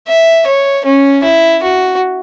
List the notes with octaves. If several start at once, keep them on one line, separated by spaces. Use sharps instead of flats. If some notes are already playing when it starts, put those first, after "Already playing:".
E5
C#5
C#4
E4
F#4